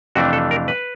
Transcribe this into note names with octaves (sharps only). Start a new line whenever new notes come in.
F2 C3 E3 A3 D4 F#4
A4
A#4
B4